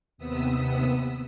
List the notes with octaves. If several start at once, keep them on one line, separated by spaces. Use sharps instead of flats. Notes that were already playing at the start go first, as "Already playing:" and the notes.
D#2 C3 B3 D#6 E6 B6